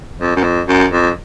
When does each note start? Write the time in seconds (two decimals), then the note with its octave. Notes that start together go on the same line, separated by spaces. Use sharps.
0.19 F2
0.36 F#2
0.43 F2
0.68 F#2
0.92 F2